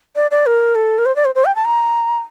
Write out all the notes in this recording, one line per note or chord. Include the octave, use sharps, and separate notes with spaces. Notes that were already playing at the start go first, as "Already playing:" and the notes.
D5
D5
A#4
A4
A#4
C5
D5
C5
C5
G5
A5
A#5